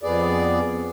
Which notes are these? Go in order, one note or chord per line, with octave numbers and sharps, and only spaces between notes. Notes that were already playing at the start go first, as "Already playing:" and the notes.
F2 B3 G#4 D5